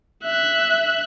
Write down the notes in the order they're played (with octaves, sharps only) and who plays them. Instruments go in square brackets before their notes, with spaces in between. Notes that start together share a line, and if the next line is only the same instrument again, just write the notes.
[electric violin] E5 F#6